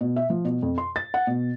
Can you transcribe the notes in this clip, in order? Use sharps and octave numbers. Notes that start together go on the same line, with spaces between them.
B2
E5
F3
B2
F2
C6
A6
F#5
B2